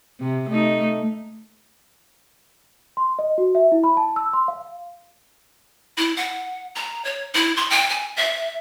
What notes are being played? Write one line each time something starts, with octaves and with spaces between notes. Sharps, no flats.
C3
A3 D#4
C6
D#5
F#4
E5
E4
B5
A5
E6
C6
F5
E4
F#5
A#5
C#5
E4
C6
G5
G#5
E5